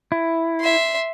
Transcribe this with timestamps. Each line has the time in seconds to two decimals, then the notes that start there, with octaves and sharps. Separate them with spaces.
0.12 E4
0.61 E5 C6